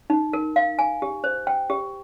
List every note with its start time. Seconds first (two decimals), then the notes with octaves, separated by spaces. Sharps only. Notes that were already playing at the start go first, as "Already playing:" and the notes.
0.10 D#4
0.33 A#4
0.56 F5
0.79 G#5
1.02 G4
1.24 C5
1.47 G5
1.70 G4